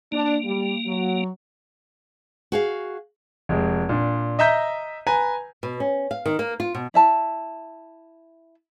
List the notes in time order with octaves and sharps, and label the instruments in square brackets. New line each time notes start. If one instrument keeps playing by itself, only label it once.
[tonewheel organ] A#3 [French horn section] D4
[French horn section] G3
F#3
[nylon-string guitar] F#4 G#4 F5
[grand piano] F1 G#3
A#2 D4
D#5 E5 A#5 G6 B6
B4 G#5 A#5
[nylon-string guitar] B2
C#4
F5
D#3
A#3
F4
B2
[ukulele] E4 E5 A5